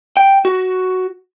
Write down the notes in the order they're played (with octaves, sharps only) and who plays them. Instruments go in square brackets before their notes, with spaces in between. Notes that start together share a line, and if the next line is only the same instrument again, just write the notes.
[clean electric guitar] G5
F#4